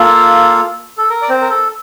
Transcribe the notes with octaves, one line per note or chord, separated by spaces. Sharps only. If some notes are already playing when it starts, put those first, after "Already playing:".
Already playing: A#3 F4 A4
A4
A#4
D5
C4 C5
A#4
A4